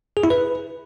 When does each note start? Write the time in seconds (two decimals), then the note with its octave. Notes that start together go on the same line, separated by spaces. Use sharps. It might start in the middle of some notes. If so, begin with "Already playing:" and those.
0.17 G#4
0.24 E4
0.30 B4